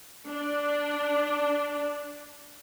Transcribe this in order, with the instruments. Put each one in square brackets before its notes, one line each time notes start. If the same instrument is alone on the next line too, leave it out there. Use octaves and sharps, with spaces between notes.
[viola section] D4 D5